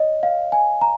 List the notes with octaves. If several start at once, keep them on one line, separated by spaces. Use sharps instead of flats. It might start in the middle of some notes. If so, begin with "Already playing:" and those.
Already playing: C#5 D#5
F5
G#5
A#5